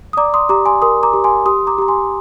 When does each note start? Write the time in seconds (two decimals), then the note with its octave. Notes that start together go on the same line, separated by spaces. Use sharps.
0.13 D#6
0.17 D5 A#5 D6
0.34 C6 D#6
0.49 G4 A#5 D6
0.66 G#5 C6
0.82 A#4 C6 D#6
1.03 A#5 D6
1.13 G4
1.24 G#5 C6
1.46 G4 C6 D#6
1.67 A#5 D6
1.78 G4 A#5
1.88 G#5 C6